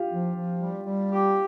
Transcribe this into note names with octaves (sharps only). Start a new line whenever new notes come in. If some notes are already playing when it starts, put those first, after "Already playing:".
Already playing: F4 G4
F3
F3
G3
G3
G4